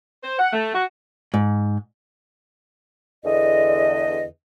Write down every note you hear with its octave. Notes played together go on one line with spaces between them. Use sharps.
C5
F#5
A3
F#4
G#2
E2 D3 D#5